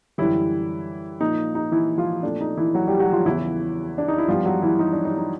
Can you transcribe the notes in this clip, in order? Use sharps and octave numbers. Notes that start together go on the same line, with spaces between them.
F#2 D3 E3 G3 E4
A#2 F3 A#3 D#4
D#4
E3 E4
F3 F4
A#2 F3 A3 C4 D4
D#4
E3 E4
F#3 F#4
G3 G4
F#3 F#4
F3 F4
E2 C#3 E3 E4
D4
D#4
E4
G2 D#3 F3 G3 B3 F4
F#3 F#4
E3 E4
D#4
D4
D#4
D#4